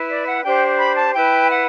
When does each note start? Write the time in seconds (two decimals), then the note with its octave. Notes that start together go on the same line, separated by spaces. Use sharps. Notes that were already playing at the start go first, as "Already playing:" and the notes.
Already playing: E4 B4
0.09 D5
0.27 F#5
0.44 D4 G4 C5 G5
0.79 B5
0.97 A5
1.15 E4 B4 G5
1.50 F#5